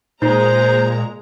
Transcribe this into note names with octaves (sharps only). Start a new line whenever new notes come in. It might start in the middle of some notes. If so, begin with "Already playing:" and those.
A#2 G#3 D#4 C5 A#5